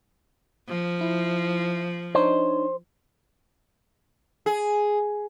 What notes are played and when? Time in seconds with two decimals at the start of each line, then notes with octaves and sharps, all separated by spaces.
0.69 F3
1.01 E4
2.15 D4 D#4 C5 C#5
4.46 G#4